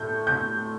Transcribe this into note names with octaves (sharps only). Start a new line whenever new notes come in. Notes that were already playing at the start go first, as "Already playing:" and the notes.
Already playing: A2 A3 G6
G6